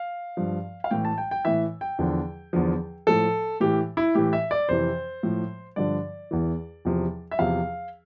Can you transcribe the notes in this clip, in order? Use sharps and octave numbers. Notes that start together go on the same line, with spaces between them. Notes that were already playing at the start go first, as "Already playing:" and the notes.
Already playing: F5
G2 F3
F5
A2 E3 G5
A5
G5
G5
A2 E3 E5
G5
E2 D3 F3
E2 D3 F3
A2 F3 A4
A2 E3 G4
E4
A2 E3 G4
E5
D5
F2 C3 E3 C5
A2 F3
G2 D3 F3 D5
E2 E3
E2 C3 F3
E5
E2 C3 F3 F5